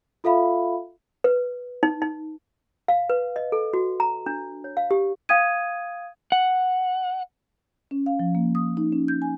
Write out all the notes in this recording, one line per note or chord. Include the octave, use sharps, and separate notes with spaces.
F4 A4 E5 F5 B5
B4
D#4
D#4
F5
B4
D#5
A4
F#4
A#5
D4
C#5
F5
G4
F5 G5 D#6 G#6 D#7
F#5
C#4
F5
F3
A#3
D#6
D#4
C#4
G6
G#5